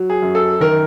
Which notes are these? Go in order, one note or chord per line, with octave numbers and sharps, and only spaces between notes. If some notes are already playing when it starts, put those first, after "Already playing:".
Already playing: F#3
G#4
F#2
A4
D#3 A#4